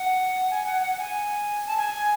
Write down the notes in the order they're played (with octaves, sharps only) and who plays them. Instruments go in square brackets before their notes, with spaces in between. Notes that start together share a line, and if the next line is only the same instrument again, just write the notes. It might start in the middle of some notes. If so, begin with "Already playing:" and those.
Already playing: [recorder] F#5
G#5
F#5
F#5
G#5
A5
G#5